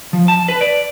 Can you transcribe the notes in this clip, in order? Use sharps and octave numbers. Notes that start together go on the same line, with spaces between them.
F3
A5
B4
D5